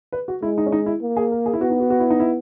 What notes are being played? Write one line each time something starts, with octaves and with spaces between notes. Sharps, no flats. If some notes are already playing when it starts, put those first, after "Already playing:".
B4
F#4
G#3 E4
D#4
C#4
D#4
E4
A#3
G#4
A#4
G#4
E4
B3 F#4
D#4
F#4
F#4
E4
D#4
E4